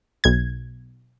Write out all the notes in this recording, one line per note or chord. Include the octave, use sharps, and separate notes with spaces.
B1 G#6